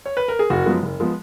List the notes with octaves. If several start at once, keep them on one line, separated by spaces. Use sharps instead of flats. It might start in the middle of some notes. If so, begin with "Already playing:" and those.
C#5
B4
A#4
G#4
F#1 F#4
F#2 F3 G#3 B3
F#1
F3 G#3 B3